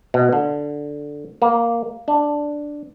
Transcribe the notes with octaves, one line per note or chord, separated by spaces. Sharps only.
B2
D3
A#3
D4